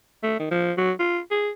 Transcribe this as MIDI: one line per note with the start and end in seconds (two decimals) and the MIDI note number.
0.23 0.37 57
0.39 0.50 51
0.51 0.73 53
0.77 0.92 54
1.00 1.20 65
1.31 1.50 68